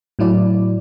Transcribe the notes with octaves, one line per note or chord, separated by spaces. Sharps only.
A2 F#3 E4 D5